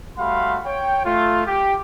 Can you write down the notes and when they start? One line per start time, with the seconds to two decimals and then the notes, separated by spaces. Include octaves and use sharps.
0.18 G3 A3 F#4 F5 B5 C6
0.66 C#5 G5
1.05 A3 F4
1.47 G4